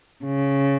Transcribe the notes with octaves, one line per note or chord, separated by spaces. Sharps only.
C#3